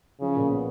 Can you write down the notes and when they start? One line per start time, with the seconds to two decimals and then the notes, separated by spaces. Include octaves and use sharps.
0.20 C#3 F3
0.36 A#2
0.50 B3